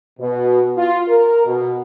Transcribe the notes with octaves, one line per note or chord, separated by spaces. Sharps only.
B2
F4
A#4
B2